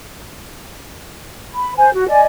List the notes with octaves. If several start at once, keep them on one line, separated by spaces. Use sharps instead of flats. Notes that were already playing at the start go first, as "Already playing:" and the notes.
B5
C5 G#5
F#4
D5 D#5 G#5